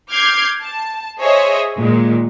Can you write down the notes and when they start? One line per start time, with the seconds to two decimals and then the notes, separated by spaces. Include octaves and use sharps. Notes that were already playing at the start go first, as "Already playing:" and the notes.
0.11 D6 F6 G6 G#6 C7
0.62 A5
1.20 G#4 C5 C#5 D#5 E5
1.79 A#2 D#3 G#3